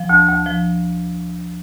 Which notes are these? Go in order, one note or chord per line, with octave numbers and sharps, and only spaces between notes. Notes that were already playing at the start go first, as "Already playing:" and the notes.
Already playing: F3
D2
D2
F3